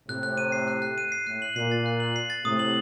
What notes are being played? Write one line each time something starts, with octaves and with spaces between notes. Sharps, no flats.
A2 C3 F#6
F#6
D#7
C7
F#6
F#6
D#7
C7
A2 F#6
F#7
A#2 C7
A6
F#6
F#7
C7
A6
A2 C3 D#6
F#7